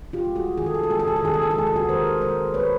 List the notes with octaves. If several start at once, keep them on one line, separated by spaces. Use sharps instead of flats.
F4 G4
G#3
F#4 G#4
D#3 G#4
A4
G#4
A4
G#3 G#4
A4
G#4
A4
D#3 G#4
A4
G#4
A4
G#3 G#4
A4
F#4 G#4
D#3 A#4 C5
G#3 A#4 C5
A#2 B4 C#5